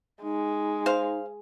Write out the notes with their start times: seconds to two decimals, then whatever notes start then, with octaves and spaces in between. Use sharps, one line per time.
0.23 G#3 D#4
0.86 C5 F5